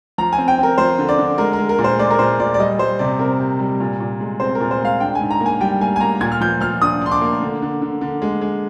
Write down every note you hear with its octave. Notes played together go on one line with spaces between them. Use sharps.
F3 A#5
G#5
C4
G5
C4 A#4
F3 C5
D3
D5
D3
G#3 A#4
A#4
G#3
A#4
A#2
C5
G#3 D5
A#4
A#2 C5
A#2 D5
D5
G3 D#5
G3 C5
C3 D5
C4 A#4
C3
G3
A#2
A#2
G#3
C4 C5
A#4
A#2
C5
G#3 F5
D4 G5
G#5
G#2
A#5
A#3
G#5
G3 G5
A#3 G#5
G#5
A#3 A#5
A#2 G#6
F6
F3 G6
F3 F6
D4 D#6
D4 C6
D6
A#3
D3
D3
D3
D3
G#3
G#3